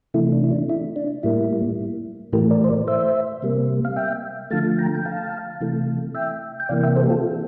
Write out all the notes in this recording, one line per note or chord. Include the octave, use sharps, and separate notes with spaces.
C3 E3 A3 E4
D4
E4
D4
E4
D4
A2 G3 A#3 E4
A2 E3 A3 G4 A#4
A#4 D5
C5
A#4 D5
C5 E5
C3 G3 A#3
F5
E5 G5
D3 F3 A3 F5 A5
G5 A#5
G5
F5 A5
C3 E3 A3
E5 G5
G5
C3 E3 A#3 D5 F5
E5 G5
A4 C5
G4
F4 A4